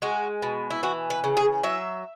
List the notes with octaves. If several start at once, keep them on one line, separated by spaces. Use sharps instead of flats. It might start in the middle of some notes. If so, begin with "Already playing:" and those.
G#3 F#4
B2
E4
E3 F#4
B4
C#3
G#4
F#3 E5